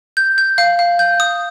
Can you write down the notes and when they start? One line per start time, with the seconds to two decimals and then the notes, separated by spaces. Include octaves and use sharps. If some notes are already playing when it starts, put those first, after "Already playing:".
0.17 G6
0.38 G6
0.58 F5
0.79 F5
0.99 G6
1.20 D#6